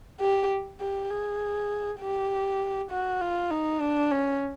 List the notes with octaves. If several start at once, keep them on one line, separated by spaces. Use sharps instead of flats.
G4
G4
G#4
G4
F#4
F4
D#4
D4
C#4